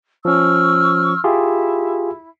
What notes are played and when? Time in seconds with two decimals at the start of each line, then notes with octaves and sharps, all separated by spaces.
0.25 F3 C#4 C#6 E6 F6
1.24 E4 F4 G4 G#4